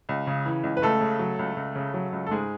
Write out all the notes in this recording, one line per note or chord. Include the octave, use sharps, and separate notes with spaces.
C#2
C#3
E3
C#2
B4
C#2 A3 A4
C#3
F#3
C#2
C#2
C#3
F#3
C#2
A4
G#2 G#3 G#4